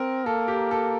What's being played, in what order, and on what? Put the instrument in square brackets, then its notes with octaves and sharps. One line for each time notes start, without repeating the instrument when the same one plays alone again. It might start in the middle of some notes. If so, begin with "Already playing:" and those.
Already playing: [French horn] C4 [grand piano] A#4
[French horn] A#3 [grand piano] A4
[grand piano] G4
A4